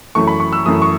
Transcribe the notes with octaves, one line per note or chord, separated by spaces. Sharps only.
F#2 E3 A3 C#6
B5
C#6
E6
F#2 E3 A3 D#6
C#6